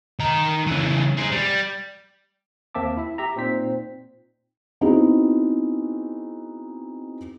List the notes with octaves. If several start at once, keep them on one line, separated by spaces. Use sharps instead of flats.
D#3 A#5
C#3 E3
G#4 C5
G3
D#2 A#3 C4 E5 A5 D6
E4 E5
G4 E5 A#5
A#2 C4 D#4 C5 B6
B3 C4 D#4 E4 F#4 G#4